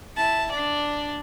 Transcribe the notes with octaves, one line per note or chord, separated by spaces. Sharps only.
E4 A5
D4 D5